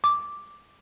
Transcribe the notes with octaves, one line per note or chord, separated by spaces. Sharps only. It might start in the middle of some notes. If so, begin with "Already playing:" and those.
D6